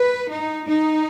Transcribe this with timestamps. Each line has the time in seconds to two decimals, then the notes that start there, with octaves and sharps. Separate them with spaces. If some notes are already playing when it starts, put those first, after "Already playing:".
Already playing: B4
0.28 D#4
0.65 D#4